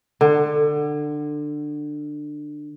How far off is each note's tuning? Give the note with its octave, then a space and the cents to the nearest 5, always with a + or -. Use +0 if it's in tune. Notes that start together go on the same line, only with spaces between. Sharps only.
D3 +20